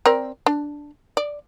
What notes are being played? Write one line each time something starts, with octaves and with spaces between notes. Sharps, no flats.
C4 A#4 D5
D4
D5